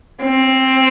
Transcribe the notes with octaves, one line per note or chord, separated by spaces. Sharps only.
C4